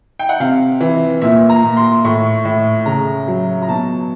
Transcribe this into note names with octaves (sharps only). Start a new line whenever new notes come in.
G5
F#5
C3 F5
E3
A#2 E5
A#5
A#2
C6
A2 C#6
A2
C#3 A#5
F#3
A#5
B2 A5